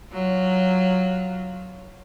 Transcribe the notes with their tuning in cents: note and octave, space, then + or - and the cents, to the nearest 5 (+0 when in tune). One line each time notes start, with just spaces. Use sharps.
F#3 +0 F4 +0